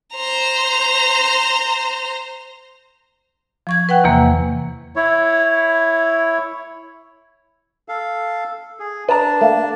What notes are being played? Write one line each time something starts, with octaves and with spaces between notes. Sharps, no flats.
C5 A#5
F3 C#6 G#6
B4 F#5 G5 F#6
E2 C3 E3 A#3
E4 C#5
A4 F5
G#4
D4 B4 A5 A#5
A3 A#3